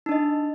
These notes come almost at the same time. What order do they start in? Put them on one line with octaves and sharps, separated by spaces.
D#4 D4 D#5